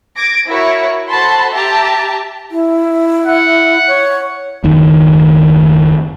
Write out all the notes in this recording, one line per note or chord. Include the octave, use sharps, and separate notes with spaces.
D6 G#6 A#6 D7
E4 F#4 A#4 C#5
F#4 A4 C5 A5 B5 C6
G4 E5 A5 A#5
E4
F#5
C#5
F#1 D#2 D#3